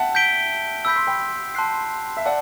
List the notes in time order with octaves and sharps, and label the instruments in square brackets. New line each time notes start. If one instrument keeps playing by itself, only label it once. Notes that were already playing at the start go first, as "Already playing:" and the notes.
Already playing: [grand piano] E5 F#5 G5 A5
[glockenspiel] G6 B6 D7 G7
[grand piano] B5 [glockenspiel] E6 G6 B6
[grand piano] C6
G5 B5
[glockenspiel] A5 C6 F#6 C7
[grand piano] E5
[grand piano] D5 F#5 [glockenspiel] A5